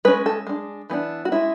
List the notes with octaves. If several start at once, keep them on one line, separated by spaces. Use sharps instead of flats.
G#3 C#4 B4
A4
G#3 D4
E3 B3 D4
F#4
G#3 C#4 E4